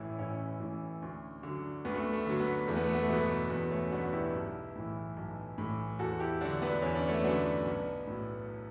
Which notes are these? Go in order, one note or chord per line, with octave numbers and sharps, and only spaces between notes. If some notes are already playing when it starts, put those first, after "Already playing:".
Already playing: A1 A2 E3 C#4 E4
A1 C#4 E4
A2 E3
D2
D3 F#3
D2 B3
A3
B3
A3
D3 F#3
B3
E2 A3
B3
A3
B3
A3
B2 F#3 B3
A3
E2 B3
A3 C#4
B2 F#3 B3 D4
F#4
E4 G4
B1
A2 E3
B1
A2 E3
E2 F#4 A4
E4 G4
D3 F#3 D4 F#4
B3 D4
E2 C#4
D4
A3 C#4
D3 F#3 B3 D4
B1
A2 F#3